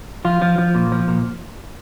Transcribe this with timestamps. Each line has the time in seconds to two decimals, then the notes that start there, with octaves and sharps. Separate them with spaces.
0.25 F3 F4
0.42 F3
0.58 F3
0.75 A#2
0.92 F3
1.08 A#2